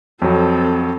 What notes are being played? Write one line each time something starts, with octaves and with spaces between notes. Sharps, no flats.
F2 F#3 C4 A4